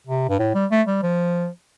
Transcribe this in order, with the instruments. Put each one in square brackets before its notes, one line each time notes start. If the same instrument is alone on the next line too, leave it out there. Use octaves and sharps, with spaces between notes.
[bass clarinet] C3
G2
A2
G3
A3
G3
F3